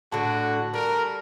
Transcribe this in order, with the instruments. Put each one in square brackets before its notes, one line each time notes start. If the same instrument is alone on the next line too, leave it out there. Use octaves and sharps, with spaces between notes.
[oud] A2 D3 [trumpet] F#4 [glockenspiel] A5
[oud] G3 [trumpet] A#4